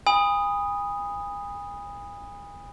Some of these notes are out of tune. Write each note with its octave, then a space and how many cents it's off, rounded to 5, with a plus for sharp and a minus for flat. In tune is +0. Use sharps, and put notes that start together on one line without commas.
G#5 -40 B5 +0 D#6 +0